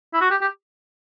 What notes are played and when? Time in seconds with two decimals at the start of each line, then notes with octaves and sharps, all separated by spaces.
0.14 E4
0.21 F#4
0.31 G4
0.42 G4